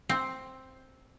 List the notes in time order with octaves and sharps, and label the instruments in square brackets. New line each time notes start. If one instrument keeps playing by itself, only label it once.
[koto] C4